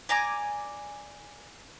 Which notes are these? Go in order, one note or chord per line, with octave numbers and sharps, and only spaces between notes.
D5 G#5 A#5 D6